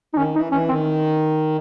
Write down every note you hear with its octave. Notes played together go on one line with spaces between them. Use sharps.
D#4
D#3 C#4
E3 D#4
E3 C#4
D#3 C4